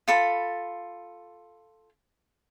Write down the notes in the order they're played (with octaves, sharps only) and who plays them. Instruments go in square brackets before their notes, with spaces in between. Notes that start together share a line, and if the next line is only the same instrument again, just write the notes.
[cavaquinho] F4 A4 B5